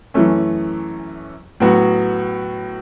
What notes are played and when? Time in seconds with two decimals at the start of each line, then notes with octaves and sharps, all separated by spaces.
0.14 F#2 E3 A3 C#4
1.60 A2 F#3 B3 F#4